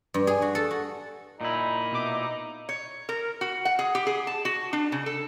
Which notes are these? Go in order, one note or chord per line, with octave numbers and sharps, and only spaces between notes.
G2
G#4
F#4
A4
F#4
A#2 D#4 E4
B2 E5 D6
C#5
A#4
F#4
F#5
G#4
G4
G#4
A5
F#4
D4
C#3
A4